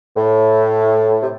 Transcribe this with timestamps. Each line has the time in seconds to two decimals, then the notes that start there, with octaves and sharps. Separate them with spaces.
0.17 A2
1.21 C3